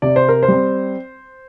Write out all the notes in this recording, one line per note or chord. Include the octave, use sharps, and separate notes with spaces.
C3 D5
C5
A#4
C5
G3 C4